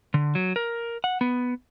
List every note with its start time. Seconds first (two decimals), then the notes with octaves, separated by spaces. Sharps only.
0.14 D3
0.35 F#3
0.56 A#4
1.04 F#5
1.21 B3